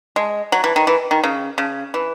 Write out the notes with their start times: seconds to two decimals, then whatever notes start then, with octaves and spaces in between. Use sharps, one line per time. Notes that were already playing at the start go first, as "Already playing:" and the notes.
0.16 G#3
0.52 F#3
0.64 E3
0.76 D#3
0.87 E3
1.11 D#3
1.24 C#3
1.58 C#3
1.94 E3